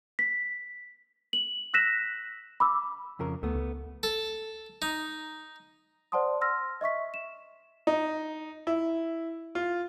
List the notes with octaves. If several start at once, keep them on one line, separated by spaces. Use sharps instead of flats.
B6
F#7
E6 F#6 A#6 B6 E7
B5 D6 E6
F2 C#3 A#4
D2 A3 B3
C#2
A4
D#4
C5 D5 F#5 A5 C6 D#6
C6 E6 F6 A#6
D#5 E5 C#6 B6
E7
D#4
E4
F4